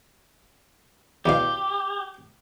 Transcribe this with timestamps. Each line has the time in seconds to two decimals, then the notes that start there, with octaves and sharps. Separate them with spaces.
1.26 E2 B2 G4 F5